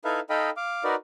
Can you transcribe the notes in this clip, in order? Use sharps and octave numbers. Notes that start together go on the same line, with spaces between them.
D#4 E4 A4 B4 E5 F5
D#4 A4 D#5 F5 G5 B5
F5 D6
D#4 F#4 A#4 B4 D5